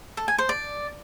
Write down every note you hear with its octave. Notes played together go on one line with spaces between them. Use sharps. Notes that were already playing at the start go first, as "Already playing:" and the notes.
A4
G#5
C5
D5